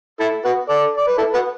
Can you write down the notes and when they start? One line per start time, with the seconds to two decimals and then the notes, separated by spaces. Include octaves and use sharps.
0.20 E4 A4
0.44 F#4 B4
0.68 A4 D5
0.97 D5
1.07 B4
1.18 E4 A4
1.34 F#4 B4